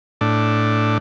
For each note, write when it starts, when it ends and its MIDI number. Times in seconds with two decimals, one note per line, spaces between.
0.21 0.98 45
0.21 0.98 62